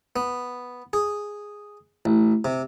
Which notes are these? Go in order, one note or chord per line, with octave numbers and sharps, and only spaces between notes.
B3
G#4
A1
C3